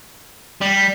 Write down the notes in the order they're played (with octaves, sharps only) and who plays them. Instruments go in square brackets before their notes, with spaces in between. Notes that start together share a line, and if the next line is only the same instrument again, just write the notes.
[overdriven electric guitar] G3